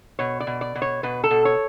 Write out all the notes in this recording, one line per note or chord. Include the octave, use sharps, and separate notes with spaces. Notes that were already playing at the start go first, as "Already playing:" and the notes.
B2 C#5
D5
B2
D5
B2
C#5
B2 B4
A4
B2
C#5